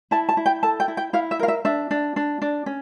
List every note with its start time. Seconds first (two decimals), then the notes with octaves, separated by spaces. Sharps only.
0.11 E4 A5
0.29 A5
0.37 E4
0.46 G5
0.63 A4 A5
0.80 G5
0.88 E4
0.97 G5
1.13 E4 F5
1.31 E5
1.39 A#4 F5
1.48 E5
1.65 D4 E5
1.91 D4
2.16 D4
2.42 D4
2.66 C#4